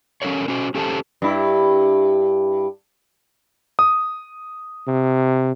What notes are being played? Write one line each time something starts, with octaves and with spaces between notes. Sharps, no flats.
C#4 E4 A4 A#4 C#5
C#4 F#4 C5
C#4 G4 A4 C5 A5
G2 E4
D#6
C3